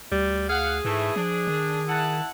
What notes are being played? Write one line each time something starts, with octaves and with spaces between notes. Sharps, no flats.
D2 G3
G#4 F5 F#5
G#2 E3 A3
F3 D4
D#3
E4 F#5 A5